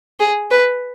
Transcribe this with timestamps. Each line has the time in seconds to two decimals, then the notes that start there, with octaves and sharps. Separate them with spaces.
0.20 G#4
0.51 B4